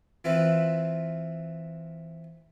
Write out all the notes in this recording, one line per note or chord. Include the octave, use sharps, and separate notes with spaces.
E3 C4 E4 F4 B4 E5